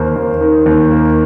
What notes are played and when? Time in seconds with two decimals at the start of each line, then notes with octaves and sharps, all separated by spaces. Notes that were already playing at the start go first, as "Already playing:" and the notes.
Already playing: D#2 A#3 C5
0.16 D#2
0.41 D#3
0.66 D#2
0.91 A#3